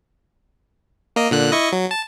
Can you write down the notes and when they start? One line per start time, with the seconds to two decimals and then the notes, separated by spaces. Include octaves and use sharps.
1.16 A#3 D#5
1.31 A#2 D3 F#6
1.52 E4 D#5 C#6
1.72 F#3
1.91 A5